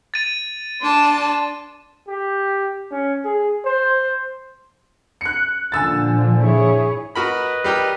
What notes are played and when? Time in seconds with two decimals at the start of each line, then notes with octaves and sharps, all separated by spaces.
0.14 A6 D#7
0.82 D4 D5 A5 C6
2.08 G4
2.91 C#4
3.25 G#4
3.66 C5
5.21 F#6 C#7
5.72 A#2 D3 F3 G#5 E6 A6
6.40 E4 G#4 C#5
7.15 F#4 A#4 B4 D#5 B5
7.64 G3 G4 A#4